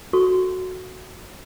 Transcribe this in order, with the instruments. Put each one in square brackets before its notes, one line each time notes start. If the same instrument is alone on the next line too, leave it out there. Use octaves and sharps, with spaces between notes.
[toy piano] F#4 A4 C#6